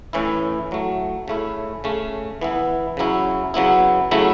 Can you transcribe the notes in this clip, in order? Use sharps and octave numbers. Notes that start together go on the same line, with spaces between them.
A2 E3 C#4 E4
A2 F#3 A3
C#3 A3 C#4 E4
C#3 A3 C#4
E3 B3 E4
C#3 F#3 C#4 E4
C#3 F#3 B3 E4
C#3 F#3 A3 E4